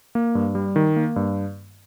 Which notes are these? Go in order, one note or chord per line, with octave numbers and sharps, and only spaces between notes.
A#3
G2
G3
D#3
A#3
G2